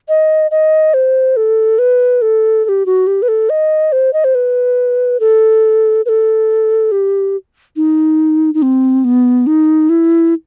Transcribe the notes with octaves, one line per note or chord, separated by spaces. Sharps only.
D#5
D#5
C5
A4
B4
A4
A4
G4
F#4
G4
B4
A4
D#5
C5
D#5
C5
B4
A4
B4
A4
G4
D#4
D#4
C4
B3
D#4
E4